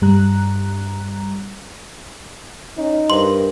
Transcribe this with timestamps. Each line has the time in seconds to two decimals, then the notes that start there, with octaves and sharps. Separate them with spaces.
0.02 G2 G3 A#5 F#6
2.78 C#4 D#4
3.10 G2 A#4 C5 C6